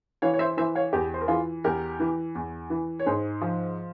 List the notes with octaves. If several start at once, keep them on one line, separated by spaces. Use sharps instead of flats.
E3 C#5 F5
C#5
C5 E5
E3 C5 E5
C#5 F5
E2 G4
C5
A#4
E3 F4 G#4
E2 G4 A#4
E3
E2
E3
C#5
G#2 G#4 C5
F3